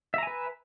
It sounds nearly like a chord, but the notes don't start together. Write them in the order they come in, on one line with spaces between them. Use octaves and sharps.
E5 A#5 G#5 B4